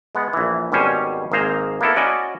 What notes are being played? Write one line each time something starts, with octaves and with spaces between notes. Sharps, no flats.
G#3 B3 F#5
A#1 E3
G#1 B2 G3 C#4 C5 G#5
G#1 A#3 G#4 C5 A#5
A#3 B3 E4 A4
C#4 F#4 D5 D#5 G#5